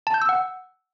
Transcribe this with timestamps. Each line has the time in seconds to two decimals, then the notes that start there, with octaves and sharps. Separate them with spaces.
0.07 A5
0.14 G6
0.22 E6
0.29 F#5